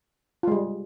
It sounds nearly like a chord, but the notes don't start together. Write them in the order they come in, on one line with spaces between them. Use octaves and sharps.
F4 G#3 G3